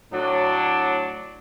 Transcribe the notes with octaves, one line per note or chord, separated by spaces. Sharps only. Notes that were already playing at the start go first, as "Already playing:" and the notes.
A2 F#3 D4